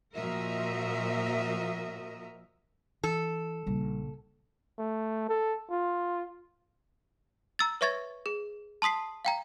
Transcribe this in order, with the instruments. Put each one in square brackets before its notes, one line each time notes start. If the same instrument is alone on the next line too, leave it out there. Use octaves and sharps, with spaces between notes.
[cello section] A#2 F3 F#4 A#4 D#5 E5
[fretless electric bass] E3 [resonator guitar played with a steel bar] A4
[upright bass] A#1 C#3 [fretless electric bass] G3
[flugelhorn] A3
A4
F4
[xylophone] A#5 E6 A6
B4 C#5 E5 C#6 G#6 A6
G#4
A5 C6 D#6 B6 C7
F5 G5 A#5